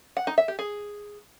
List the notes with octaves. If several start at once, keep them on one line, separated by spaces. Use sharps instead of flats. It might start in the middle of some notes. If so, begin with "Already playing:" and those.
F#5
D#4
E5
G4
G#4